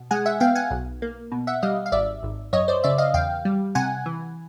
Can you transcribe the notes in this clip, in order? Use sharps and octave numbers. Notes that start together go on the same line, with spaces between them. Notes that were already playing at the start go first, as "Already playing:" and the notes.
Already playing: B2
G#3 F#5 G#5
E5 F#5
B3 F5 G5
F#5 G#5
B1
A#3
B2
E5 F#5
G3 D#5 F5
F5
G#1 D5 E5
G#1
F#2 C#5 D#5
C5 D5
C#3 D5 E5
D#5 F5
E2 F5 G5
G3
C3 F#5 G#5
E3